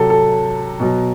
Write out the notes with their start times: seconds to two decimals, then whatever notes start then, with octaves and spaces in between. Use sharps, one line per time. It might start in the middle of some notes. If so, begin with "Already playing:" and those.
Already playing: C3 F#3 A4
0.10 A4
0.80 B2 F#3